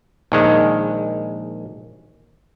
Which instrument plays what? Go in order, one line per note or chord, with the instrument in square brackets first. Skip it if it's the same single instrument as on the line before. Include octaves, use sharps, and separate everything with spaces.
[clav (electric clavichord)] A#1 D#3 G#3